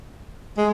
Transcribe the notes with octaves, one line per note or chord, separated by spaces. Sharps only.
G#3